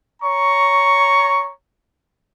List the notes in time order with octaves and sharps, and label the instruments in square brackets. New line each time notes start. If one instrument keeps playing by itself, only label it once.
[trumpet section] C#5 A#5 C#6